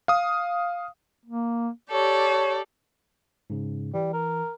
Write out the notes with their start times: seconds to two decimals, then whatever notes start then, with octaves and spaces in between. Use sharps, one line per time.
0.08 F5 D#6
1.25 A#3
1.91 G4 A4 C#5 D5
3.50 G#2 C#3
3.94 E3 G3
4.13 A#4